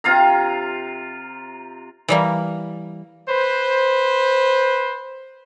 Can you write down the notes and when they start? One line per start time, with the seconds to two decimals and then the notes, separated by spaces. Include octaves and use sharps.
0.04 C3 F4 F5 A#5
2.08 E3 G3 A#3
3.29 B4 C5